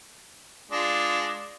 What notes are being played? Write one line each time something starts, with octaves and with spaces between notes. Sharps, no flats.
G#3 D4 F4